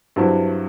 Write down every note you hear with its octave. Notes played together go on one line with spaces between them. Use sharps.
G2 F#3 C4 E4